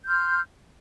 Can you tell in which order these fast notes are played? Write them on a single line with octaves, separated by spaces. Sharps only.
G6 F6 C6